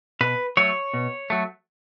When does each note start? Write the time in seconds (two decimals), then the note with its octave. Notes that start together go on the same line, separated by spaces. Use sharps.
0.21 B2 B4
0.57 F#3 A3 C#5
0.94 B2
1.30 F#3 A3